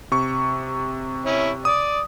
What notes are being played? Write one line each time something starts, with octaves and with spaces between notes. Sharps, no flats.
C3 C#6
C#4 E4
D5 D#6